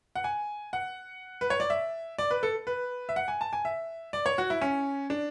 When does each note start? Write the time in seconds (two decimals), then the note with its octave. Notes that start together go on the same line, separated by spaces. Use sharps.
0.15 F#5
0.24 G#5
0.73 F#5
1.41 B4
1.50 C#5
1.60 D5
1.70 E5
2.18 D5
2.31 B4
2.43 A4
2.67 B4
3.09 E5
3.16 F#5
3.28 G#5
3.41 A5
3.53 G#5
3.65 E5
4.13 D5
4.26 C#5
4.38 F#4
4.50 E4
4.61 C#4
5.10 D4